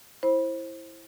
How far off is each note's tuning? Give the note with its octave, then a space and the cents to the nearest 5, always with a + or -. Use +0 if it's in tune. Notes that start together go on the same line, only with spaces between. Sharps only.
E4 +0 C5 +25 B5 -15